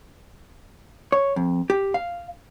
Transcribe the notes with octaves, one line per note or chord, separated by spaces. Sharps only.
C#5
F2
G4
F5